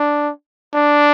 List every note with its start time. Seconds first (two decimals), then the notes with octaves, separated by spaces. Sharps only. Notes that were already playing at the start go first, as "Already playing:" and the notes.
Already playing: D4
0.74 D4